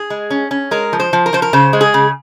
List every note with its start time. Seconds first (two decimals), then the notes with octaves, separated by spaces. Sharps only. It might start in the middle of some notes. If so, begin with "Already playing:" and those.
Already playing: G#4
0.10 G#3
0.30 C#4
0.51 C#4
0.71 G#3 A#4
0.93 F3
1.00 C5
1.13 F3
1.26 A#4
1.33 F3 C5
1.42 A#4
1.53 C#3 C5
1.73 G#3
1.81 G#4
1.94 C#3